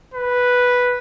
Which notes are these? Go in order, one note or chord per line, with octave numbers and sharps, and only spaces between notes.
B4